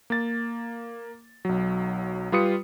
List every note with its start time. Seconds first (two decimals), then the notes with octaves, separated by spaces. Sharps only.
0.10 A#3 A6
1.45 B1 F#3
2.32 G3 F4 B4 D#6 C#7